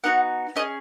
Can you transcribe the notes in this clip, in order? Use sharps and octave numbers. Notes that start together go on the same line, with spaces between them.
B3 D#4 F#4 F#5
C#4 G#4 D#5